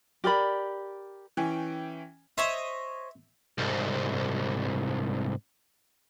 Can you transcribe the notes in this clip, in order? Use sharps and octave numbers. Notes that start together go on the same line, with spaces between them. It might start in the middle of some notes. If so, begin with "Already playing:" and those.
G4 A#4 D5 B5
E3 C#4 G5
C5 C#5 D#5 E5
C2 G#2